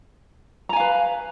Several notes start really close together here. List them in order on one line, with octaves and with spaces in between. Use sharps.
A#5 G#5 F5 B4